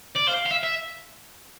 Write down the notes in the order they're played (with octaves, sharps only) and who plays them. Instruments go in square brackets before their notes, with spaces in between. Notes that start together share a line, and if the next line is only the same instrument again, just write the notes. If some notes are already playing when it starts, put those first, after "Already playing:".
[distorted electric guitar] D5
[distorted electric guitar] C5 [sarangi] F5
[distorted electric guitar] F5
E5
E5